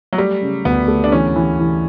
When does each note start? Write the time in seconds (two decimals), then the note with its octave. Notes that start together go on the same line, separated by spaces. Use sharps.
0.13 F#3
0.18 G3 A3
0.42 C#3
0.65 D2 B3
0.88 A3
1.04 D4
1.12 E3 C#4
1.36 E3
1.59 E3